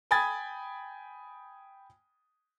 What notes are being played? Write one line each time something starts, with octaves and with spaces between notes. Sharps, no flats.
G5 G#5 B5 D#6 G#6 A6